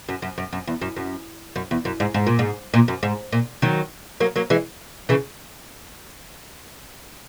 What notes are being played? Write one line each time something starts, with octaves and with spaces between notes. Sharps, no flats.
F#2
F#2
F#2
F#2
E2
F#2
F#2
F#2
E2
F#2
G#2
G#2
A#2
G#2
A#2
F#2
G#2
A#2
D#3 F#3
F#3 A#3
F#3 A#3
E3 G#3
C#3 E3